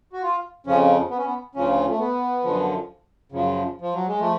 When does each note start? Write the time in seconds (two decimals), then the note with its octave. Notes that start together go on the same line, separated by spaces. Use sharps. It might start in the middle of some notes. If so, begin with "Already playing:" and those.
0.13 F#4
0.23 F4
0.66 F2 C#3 F3 C#4
1.10 B3
1.18 C#4
1.25 B3
1.55 D2 C#3 F3 C#4
1.89 A3
1.98 B3
2.44 F#2 D3 F3
3.32 F#2 C#3 F3
3.81 F3
3.94 F#3
4.07 G#3
4.19 F3 A3